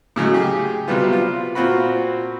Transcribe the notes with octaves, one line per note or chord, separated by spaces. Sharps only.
A2 C#3 F#3 G#3
G4 G#4
C3 F#3 G3 B3 F4
F4
A#2 C4 F4 F#4 B5